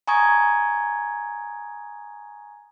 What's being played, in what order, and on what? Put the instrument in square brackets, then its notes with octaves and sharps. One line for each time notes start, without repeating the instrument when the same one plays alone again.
[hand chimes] G#5 A#5 C#6 D#6 G#6